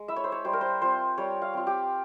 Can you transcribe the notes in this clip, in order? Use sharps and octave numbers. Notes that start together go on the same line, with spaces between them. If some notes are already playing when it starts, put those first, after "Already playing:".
Already playing: G#3
E4 E5
C#5
C5
C#5
G3 C5
A#4
C5
C4 F4 C5
G3 C#5
F5
C4 F4
G4